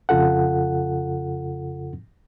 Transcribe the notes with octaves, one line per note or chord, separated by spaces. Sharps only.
F2 C#3 F4 A4 F#5